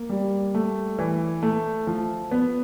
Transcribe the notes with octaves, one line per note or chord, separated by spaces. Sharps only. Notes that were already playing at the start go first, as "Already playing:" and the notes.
Already playing: A#3
G3
A3
E3
A3
F3
B3